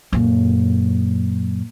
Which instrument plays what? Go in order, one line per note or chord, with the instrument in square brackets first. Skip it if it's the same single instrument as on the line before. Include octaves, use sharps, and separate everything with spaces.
[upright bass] F#2 A#2